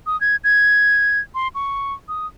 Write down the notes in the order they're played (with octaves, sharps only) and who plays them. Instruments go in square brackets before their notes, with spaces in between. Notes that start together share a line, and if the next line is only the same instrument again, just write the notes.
[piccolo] D#6
G#6
G#6
C6
C#6
D#6